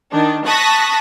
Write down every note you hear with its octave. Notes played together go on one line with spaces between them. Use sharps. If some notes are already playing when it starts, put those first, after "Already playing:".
D#3 D4
A5 C#6 D#6 F#6 A#6 B6